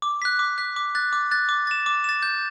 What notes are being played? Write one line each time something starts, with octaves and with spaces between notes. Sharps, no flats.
D6
F#6 B6
D6
F#6 B6
D6
F#6 A6
D6
F#6 A6
D6
A6 E7
D6
A6 E7
G6